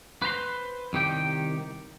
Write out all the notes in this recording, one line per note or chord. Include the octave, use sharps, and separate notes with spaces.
B4 C5 A#5 C6
C2 D#3 G4 G5